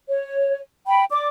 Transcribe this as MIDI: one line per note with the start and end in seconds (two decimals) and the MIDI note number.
0.08 0.58 73
0.86 1.03 79
0.86 1.03 83
1.11 1.28 74
1.11 1.28 86